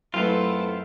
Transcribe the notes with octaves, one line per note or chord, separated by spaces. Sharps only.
F#2 A3 B3 C4 E4 F4 A4 B4